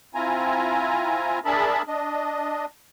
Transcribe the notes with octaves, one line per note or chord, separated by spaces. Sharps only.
C4 E4 F4 G#5 A#5
D4 G#4 A#4 E5 A5 B5
D4 D#5